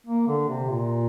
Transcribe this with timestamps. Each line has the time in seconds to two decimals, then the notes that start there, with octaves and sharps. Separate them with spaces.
0.07 A#3
0.28 D3
0.49 C3
0.69 A#2